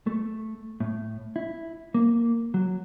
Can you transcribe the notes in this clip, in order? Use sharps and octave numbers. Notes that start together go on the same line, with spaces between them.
A3
A2
E4
A#3
F#3